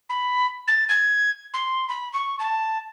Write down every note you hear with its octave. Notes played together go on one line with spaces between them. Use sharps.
B5
A6
G#6
C6
B5
C#6
A5